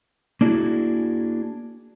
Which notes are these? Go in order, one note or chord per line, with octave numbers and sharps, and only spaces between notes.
A#3 D4 E4 F#4 G#4